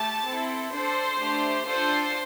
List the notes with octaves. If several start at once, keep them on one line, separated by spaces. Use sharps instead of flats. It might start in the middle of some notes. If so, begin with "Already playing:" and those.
Already playing: A3 G4 A5
C4 E4 A4
D4 A4 C5
A3 D4 G4
D4 F4 A4 C5